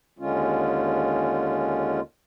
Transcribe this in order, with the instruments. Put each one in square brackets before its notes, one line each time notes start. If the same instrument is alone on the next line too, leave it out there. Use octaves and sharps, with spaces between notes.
[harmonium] D#2 D3 G#3 C#4 F4